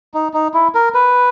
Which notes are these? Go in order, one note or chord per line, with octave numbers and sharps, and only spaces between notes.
D#4
D#4
E4
A#4
B4